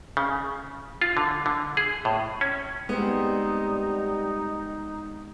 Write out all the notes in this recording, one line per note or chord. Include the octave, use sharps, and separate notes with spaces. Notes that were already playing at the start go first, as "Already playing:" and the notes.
C#3
F4
D3
D3
G#4
A2
C#4
G3 G#3 B3 C4 D#4